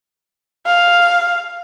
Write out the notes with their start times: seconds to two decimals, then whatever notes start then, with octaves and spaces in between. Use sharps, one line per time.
0.66 F5